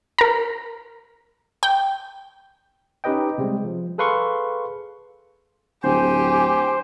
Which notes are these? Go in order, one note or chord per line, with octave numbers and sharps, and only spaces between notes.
A#4 A#5
G5
C#4 D#4 G4 B4 D#5 G5
C3 G3 G#3 C4
F3
G#4 A4 B4 F5 C6 C#6
D1 G4 C5 G#5